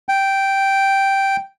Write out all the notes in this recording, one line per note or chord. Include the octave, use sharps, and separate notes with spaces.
G5